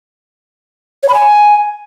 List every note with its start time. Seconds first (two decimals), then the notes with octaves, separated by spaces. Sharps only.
1.03 C#5
1.08 B5
1.14 G#5